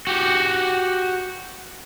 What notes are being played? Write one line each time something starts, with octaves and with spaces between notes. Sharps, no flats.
F#4 G4